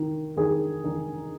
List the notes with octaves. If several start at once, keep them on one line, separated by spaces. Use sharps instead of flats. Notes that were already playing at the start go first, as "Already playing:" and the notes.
Already playing: D#3
D#3 G#4
D#3 D#4